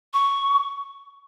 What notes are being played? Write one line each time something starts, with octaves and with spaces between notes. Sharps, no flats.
C#6